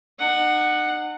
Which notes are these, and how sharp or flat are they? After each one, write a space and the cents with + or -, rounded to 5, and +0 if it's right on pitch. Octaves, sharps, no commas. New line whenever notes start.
D#4 -45 F#5 +0